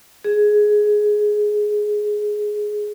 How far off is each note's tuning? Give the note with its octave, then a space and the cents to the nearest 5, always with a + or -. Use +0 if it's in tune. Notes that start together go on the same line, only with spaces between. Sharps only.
G#4 +10